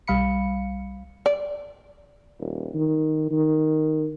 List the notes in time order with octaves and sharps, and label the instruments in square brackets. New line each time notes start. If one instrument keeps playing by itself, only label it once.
[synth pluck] B1 G3 F5 B5 C#7
[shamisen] D5
[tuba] D#1
D#3
D#3